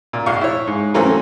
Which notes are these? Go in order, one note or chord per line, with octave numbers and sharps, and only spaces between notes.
A#2
A#1 F5 C#6
E4 C#5
G#2
E3 F#3 A3 A#3 C4 C#4